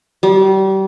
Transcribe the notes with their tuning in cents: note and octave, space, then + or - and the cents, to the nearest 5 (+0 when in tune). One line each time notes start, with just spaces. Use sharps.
G3 -30